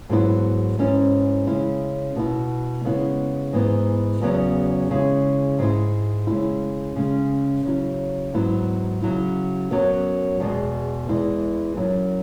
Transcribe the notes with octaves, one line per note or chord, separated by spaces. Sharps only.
G#2 F#3 B3 E4
G#2 E3 C#4 E4
C#3 G#3 C#4 E4
B2 B3 E4
C#3 G#3 B3 E4
G#2 E3 B3
E2 C#3 F#3 B3
C#3 G#3 E4
G#2 G#3 E4
C#3 G#3 E4
C#3 G#3 C#4
C#3 F#3 E4
G#2 F#3 B3 E4
C#3 F#3 E4
F#2 F#3 B3
E2 B2 G#3
E2 E3 G#3 E4
F#2 F#3 E4